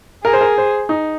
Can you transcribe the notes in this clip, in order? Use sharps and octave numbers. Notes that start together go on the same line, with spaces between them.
G#4 A#4
C5
A#4
C5
D#4